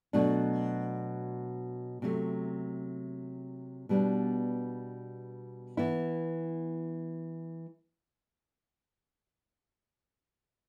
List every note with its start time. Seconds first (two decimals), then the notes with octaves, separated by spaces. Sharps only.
0.13 B2 F#3 A3 D4
2.02 C3 F#3 A3
3.89 B2 G3 B3 D4
5.77 E3 B3 E4